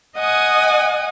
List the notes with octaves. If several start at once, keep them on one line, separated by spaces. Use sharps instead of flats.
D#5 F#5 G#5 D#6